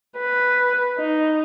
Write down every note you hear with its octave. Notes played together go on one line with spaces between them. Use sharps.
B4
D#4